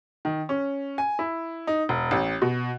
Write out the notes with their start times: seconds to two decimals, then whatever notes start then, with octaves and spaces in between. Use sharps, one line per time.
0.25 D#3
0.49 C#4
0.98 G#5
1.19 E4
1.67 D#4
1.89 E1
2.11 A1
2.42 B2